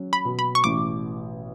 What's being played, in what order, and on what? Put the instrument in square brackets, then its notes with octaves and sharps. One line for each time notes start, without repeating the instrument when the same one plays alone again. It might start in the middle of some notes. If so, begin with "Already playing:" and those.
Already playing: [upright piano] F#3 C#4
[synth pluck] B5
[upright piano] B2
[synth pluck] B5
C#6
[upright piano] A1 [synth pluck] D6